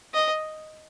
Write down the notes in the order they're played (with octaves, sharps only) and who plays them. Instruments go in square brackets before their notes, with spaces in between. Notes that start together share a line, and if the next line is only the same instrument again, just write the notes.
[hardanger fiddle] D#5